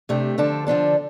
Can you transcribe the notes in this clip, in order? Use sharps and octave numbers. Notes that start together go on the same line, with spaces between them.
C3 A3 D4 G4
D3 F3 D4 A4
D3 F3 D4 A4